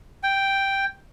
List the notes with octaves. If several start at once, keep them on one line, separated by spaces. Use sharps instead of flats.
G5